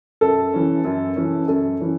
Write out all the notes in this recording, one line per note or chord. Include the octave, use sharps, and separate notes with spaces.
F#2 A4
E3 C#4
F#2
E3 C#4
F#2 A4
E3 C#4